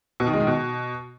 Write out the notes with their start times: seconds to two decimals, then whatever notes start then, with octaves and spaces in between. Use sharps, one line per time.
0.20 B2
0.27 D#3
0.33 G#3
0.40 D#3
0.47 B2